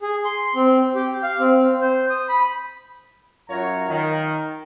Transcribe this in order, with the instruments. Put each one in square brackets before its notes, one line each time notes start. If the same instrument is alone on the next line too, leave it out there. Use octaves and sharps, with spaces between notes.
[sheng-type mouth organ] G#4
C6
C4
G4
F5
C4
C5
D#6
B5
[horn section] F#2 F4 C#5 A#5
D#3